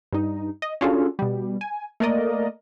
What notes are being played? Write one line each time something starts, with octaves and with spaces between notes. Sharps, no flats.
G2 D#4
D#5
C#4 D4 F4 F#4 G#4 A4
B2 G3
G#5
A3 A#3 A#4 D5 D#5